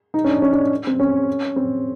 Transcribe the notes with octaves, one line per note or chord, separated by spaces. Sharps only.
D#4
C#4
D4
C#4
D4
C4
C#4
C4